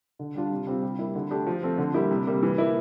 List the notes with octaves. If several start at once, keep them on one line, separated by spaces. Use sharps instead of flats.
D3
G3 D4 F4
C3
G3 C4 F4
G3
A#3 E4
D3
A3 D4 G4
F3
A3 C4
D3
G3 A#3 E4 G4
C3
G3 A#3
E3
A#3 E4